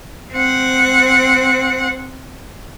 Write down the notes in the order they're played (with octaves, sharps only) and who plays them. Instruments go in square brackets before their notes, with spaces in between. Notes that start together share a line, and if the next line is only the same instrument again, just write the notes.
[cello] C4 F#5